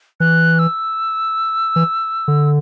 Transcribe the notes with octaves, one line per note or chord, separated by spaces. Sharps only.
E3 F#6
E6
E3
D3